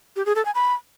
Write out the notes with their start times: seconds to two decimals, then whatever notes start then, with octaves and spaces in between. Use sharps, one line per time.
0.16 G4
0.26 G#4
0.36 A4
0.45 G#5
0.55 B5